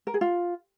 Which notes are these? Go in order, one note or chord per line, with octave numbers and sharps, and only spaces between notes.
A#4
G#4
F4